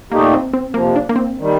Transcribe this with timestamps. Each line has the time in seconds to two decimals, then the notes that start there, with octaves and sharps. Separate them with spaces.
0.12 A#2 A3 A#3 D#4 G4
0.34 C4
0.54 C4
0.74 F2 C3 F3 A#3
0.96 D4
1.09 A#3
1.16 C4
1.39 D#3 G3